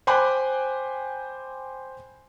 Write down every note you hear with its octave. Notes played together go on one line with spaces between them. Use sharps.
C5 G5 G#5 B5 D6 F#6